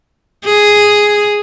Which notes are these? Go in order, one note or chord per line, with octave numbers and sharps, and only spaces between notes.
G#4